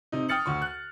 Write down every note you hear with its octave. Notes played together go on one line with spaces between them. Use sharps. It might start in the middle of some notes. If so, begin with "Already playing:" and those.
C3 D#4
G5 D#6 F6 A6 C#7 F#7
D2 C#6
F#6